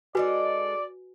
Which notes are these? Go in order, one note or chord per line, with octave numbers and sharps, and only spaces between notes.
G#3 D#4 F#4 A4 B4 D5 G#5